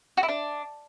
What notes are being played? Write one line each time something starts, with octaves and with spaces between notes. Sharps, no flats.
F#4
E4
D4